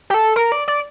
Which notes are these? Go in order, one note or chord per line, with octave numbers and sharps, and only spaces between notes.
G4
A4
A#4
D5
D5